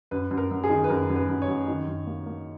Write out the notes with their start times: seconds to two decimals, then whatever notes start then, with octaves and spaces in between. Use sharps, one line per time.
0.11 F#2 B4
0.31 F#2
0.37 A#4
0.51 F#2
0.64 G#4
0.70 D#3
0.84 B4
0.90 F#2 A#4
1.10 F#2
1.16 B4
1.29 F#2
1.42 C#5
1.48 F#2
1.68 D#3
1.87 F#2
2.07 A#3
2.26 A#3